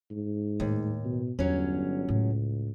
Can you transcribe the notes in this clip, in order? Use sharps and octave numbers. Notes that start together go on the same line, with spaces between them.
G#2
D#2 A2 A3
B2
G1 E2 F#3 C#4
C#2 A2